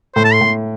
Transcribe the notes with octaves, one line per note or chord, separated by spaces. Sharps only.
A2 C5
A5
C6
A2